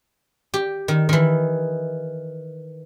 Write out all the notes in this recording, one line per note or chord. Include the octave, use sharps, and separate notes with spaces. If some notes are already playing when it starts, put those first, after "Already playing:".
G4
D#3
D#3 E3